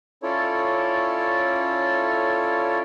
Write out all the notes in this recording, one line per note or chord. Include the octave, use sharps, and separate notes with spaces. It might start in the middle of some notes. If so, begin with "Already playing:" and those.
C#4 E4 F4 A4 C#5 D5